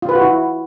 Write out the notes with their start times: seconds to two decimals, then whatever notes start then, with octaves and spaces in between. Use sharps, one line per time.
0.02 F4
0.09 B4
0.15 F#4
0.21 E4